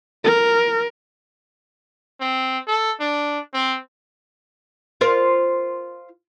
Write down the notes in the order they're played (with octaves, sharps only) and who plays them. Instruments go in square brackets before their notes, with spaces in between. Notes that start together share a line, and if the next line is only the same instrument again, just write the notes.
[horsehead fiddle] A#4
[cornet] C4
A4
D4
C4
[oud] F4 A#4 C5